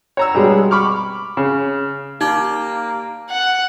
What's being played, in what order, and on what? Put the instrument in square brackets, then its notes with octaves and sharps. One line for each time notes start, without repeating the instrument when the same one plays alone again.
[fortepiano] C#5 A#5 E6
G2 B2 G3 G#3
B5 C#6 D6 F6
C#3
[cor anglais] A#3 [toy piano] D#4 [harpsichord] G4 D5 G5
[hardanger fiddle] F#5